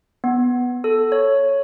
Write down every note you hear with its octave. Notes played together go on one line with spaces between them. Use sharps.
B3
A4
C#5